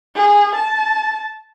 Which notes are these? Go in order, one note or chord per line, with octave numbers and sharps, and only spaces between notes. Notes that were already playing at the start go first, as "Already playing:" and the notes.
G#4
A5